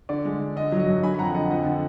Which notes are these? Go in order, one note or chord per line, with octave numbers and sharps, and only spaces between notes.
D3 D5
G#3
D3
D3 D#5
F#3
D#5
F#2
D3 G#5 B5
B5
F2 F#5 A#5
D3 D#5 F#5
F2 D#5 F#5
D3